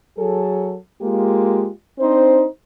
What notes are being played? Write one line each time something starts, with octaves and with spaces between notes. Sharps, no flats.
F#3 G#4 A4
G#3 A#3 F4 G4
C4 D4 D#4 C5